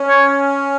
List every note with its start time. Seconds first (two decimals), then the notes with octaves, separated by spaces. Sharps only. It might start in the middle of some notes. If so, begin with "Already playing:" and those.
Already playing: C#4
0.09 C#5